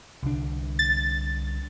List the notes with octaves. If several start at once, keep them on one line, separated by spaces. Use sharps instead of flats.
C2 D3 D4
A6